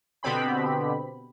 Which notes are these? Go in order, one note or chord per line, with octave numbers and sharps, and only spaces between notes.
B2 D3 B3 C4 G4 B5